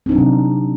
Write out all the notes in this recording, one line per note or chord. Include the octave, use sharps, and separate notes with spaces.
C3 F#3 C4 D4 D#4